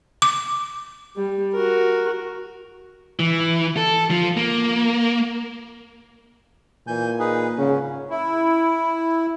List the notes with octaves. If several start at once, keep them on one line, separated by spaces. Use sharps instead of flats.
D6
G3
F#4 A#4
E3
A4
F3
A#3
A#2 E3 G#5 G6
D#4 G#4 B4
G#2 C#3 C#4
E4